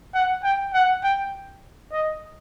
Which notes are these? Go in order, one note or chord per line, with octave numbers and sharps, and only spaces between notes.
F#5
G5
F#5
G5
D#5